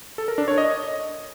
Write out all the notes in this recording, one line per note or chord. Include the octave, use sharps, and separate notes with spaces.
A4
A#4
D4
C#5
D#5